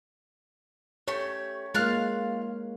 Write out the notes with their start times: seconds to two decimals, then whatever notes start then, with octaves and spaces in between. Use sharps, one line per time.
1.08 A3 G4 C#5
1.75 G#3 A#3 F4 F5 F#6